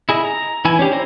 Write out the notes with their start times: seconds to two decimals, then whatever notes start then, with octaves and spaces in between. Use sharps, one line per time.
0.09 E4 G#4 D#5
0.25 A#5
0.65 E3 E4 G#5
0.79 C#4 D4 G4
0.92 E4 C5 A#5